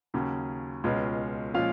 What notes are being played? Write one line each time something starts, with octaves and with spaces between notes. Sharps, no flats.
D#2 C#3 F#3 C#4
C#2 B2 G#3 C#4 F4
A#2 F3 G#3 C#4 F4 F5